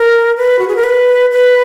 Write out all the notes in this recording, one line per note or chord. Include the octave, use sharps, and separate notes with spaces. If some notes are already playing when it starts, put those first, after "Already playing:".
Already playing: A#4
B4
F#4
G#4
A#4
B4
B4